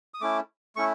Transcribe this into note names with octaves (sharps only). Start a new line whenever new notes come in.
D#6
A3 C#4 E4 D6
A3 C#4 E4 C#6